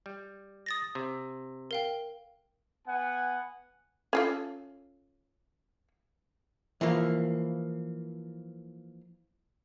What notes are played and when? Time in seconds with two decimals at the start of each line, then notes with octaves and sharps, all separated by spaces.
0.06 G3
0.66 D#6 A6 A#6
0.95 C3
1.71 A#4 F5 G5
2.88 B3 F#5 G#5
4.13 C#4 F4 A4
6.81 E3 F3 A#3